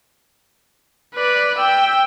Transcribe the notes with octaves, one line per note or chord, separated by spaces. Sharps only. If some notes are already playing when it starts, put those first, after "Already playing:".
B4 D5
G5 E6